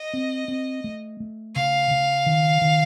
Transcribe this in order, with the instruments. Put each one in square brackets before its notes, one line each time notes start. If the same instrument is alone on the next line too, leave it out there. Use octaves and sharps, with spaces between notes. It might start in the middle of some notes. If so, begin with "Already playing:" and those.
Already playing: [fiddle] D#5
[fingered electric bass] C4
C4
A3
A3
[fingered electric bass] C#3 [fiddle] F5
[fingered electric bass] C#3
D#3
D#3